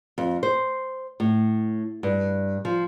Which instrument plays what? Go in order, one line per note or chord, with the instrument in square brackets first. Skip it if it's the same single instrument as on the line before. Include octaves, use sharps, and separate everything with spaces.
[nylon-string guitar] F2
C5
A2
G2
F3